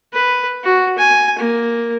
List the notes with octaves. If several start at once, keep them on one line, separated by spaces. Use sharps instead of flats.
B4
F#4
G#5
A#3